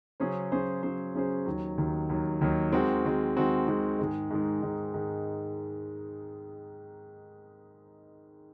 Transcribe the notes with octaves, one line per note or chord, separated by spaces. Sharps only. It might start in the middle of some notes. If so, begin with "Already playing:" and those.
C#3 F#3 C#4 G#4 C5
C#3 F#3 C#4 G#4 C5
C#3 F#3 C#4 G#4 C5
C#3 F#3 C#4 G#4 C5
D#2 D#3 F#3
D#2 D#3 F#3
D#2 D#3 F#3
D#2 D#3 F#3
D#3 G#3 C4 F#4
D#3 G#3 C4 F#4
D#3 G#3 C4 F#4
D#3 G#3 C4 F#4
G#2 D#3 G#3
G#2 D#3 G#3
G#2 D#3 G#3
G#2 D#3 G#3